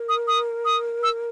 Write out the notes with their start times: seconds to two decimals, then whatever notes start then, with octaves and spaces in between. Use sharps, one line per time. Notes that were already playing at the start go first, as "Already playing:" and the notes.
Already playing: A#4
0.09 D#6
0.28 D#6
0.65 D#6
1.03 E6